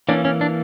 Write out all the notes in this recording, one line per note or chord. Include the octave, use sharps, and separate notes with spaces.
E3 A#3 C#4 D4
C#4
D4